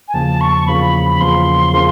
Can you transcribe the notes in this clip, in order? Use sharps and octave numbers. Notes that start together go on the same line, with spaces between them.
G#5
E2 C#3 F3 A#3 A5
C#6
E2 C#3 F3 A#3 B5
B5
E2 C#3 F3 A#3 C6
C#3 F3 A#3